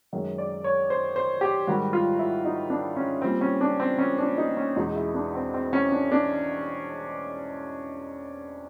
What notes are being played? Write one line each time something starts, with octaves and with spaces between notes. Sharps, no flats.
F#2 D#3 G#3
D5
C#5
C5
C5
G4
G#2 D#3 G3 F#4
F4
E4
D#4
D4
C#4
A#2 G3 C4
C#4
D4
C4
C#4
D4
D#4
C#4
E2 B2 G#3 D#4
E4
D4
C4
C4
C#4
D4
D4